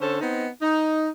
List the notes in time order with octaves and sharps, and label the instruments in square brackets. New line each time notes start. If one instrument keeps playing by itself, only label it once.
[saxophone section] D3 C#4 A4 C5
B3 C4 D#4
D#4